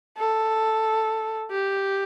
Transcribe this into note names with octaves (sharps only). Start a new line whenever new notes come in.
A4
G4